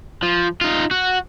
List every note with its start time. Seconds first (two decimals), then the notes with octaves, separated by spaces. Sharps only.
0.23 F3
0.61 D#4 F4
0.91 F#4